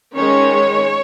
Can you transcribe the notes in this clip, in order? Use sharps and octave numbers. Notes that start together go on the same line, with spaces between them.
D#3 G#3 C#4 C#5